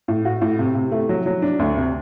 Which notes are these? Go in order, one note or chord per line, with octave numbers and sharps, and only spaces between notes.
A2
F#4
A2
C3
C3
A3
F#3
F#3
D4
D2
C3